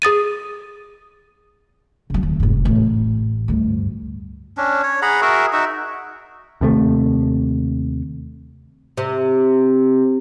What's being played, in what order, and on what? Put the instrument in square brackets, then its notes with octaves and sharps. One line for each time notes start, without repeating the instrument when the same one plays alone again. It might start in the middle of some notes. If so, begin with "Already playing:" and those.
[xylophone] G#4 D#6 A6 D#7
[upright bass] C#3 F#3
D#2
F1 G#2
A1
D2 G2
[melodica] C#4 D4
C#5
G#4 F#5 A#5 B5
F#4 G#4 A#4 E5
D#4 F#4 E5
[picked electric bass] D#2 C3 A3
[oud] C3